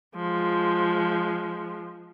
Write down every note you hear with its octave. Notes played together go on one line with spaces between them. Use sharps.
F3 G#3